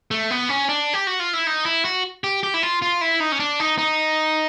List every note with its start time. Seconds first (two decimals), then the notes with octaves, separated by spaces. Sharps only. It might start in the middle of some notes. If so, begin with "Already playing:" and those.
0.11 A3
0.31 B3
0.49 C#4
0.69 D4
0.94 G4
1.07 F#4
1.20 F4
1.33 E4
1.47 D#4
1.65 E4
1.85 F#4
2.24 G4
2.43 G4
2.54 E4
2.63 F4
2.82 F4
3.01 E4
3.20 D#4
3.32 C#4
3.40 D4
3.60 D#4
3.78 D#4